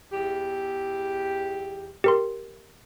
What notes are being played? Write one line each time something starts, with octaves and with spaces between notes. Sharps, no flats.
E2 G4
G4 A#4 C6